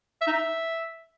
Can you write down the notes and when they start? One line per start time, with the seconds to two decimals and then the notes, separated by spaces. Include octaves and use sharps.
0.21 E5
0.27 D#4
0.33 E5